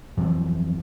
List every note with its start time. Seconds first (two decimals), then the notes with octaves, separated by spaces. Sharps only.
0.17 F2 E3 F#3 C4